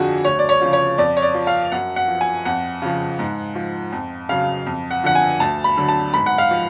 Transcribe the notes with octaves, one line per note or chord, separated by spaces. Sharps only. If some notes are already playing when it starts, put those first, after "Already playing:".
Already playing: F2 D3 F3 F#4 G#4
D2 C#5
D5
C#5
C#3 F3
C#5
F2 D5
C#5
D5
F3
F5
F#2 F#5
F#5
F3
G#5
F2 F#5
C#3 F3
G#2
F3
F2
C#3 F#3 F5
F2
F#5
D3 F3 F#5
G#5
D2 A5
B5
D3 F#3
A5
G#2 B5
F#5
F5
F3